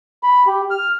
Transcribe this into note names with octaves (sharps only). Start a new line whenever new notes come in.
B5
G4
F6